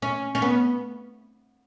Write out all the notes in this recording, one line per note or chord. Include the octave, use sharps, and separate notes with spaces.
C#4
C#4
B3